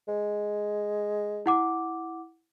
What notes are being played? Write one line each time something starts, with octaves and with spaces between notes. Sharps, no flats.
G#3
E4 F#5 D6